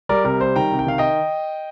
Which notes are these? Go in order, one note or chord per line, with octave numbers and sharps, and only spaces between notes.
G3 A#4 D5
C3 A#4
G3 C5
D#3 G5 A#5
C3
G5
D#3 F5
D#5 G5